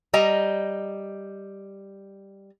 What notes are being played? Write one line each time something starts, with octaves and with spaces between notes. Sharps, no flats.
G3 D#5 A#5